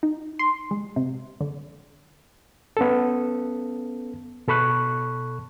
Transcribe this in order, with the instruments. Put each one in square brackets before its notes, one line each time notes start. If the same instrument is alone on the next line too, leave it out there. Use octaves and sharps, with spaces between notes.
[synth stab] D#4
C6
G#3
C3
D3
[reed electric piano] B3 C#4 A4
B2 A4 B5 C#6 F#6